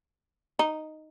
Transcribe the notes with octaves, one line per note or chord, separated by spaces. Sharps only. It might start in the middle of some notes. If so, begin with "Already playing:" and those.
D#4